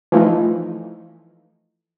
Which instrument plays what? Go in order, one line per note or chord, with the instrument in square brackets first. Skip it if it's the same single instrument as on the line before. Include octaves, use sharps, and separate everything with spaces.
[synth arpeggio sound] E3 F3 A3 D#4